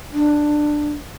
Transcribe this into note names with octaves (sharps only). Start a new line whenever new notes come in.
D4